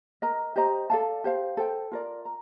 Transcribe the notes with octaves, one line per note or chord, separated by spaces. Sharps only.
A#4 D#5 A#5
G4 C5 D#5 A#5
A4 D5 F5 A5
G4 C5 F5
A4 C5 G5
F4 A#4 D5
A#5